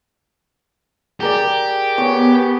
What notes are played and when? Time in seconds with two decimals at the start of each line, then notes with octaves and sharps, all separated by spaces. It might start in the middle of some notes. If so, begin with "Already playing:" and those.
1.20 G4 G#4 A#4 D5
1.98 B3 C#5 G#5